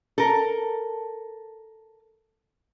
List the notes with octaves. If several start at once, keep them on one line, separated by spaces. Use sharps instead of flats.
A4 A#4